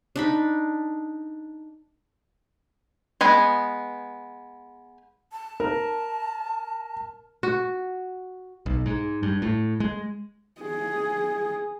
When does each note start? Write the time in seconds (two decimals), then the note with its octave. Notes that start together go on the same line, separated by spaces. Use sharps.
0.16 D4 D#4 B5
3.21 G#3 B3 B4 G#5
5.32 A5
5.60 A#4
7.43 F#4
8.66 B1
8.86 G#2
9.23 G2
9.42 A2
9.80 G#3
10.61 G#4